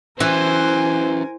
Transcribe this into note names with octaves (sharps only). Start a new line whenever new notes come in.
E3 C#4 F#4 G4 A#4 C5 G#5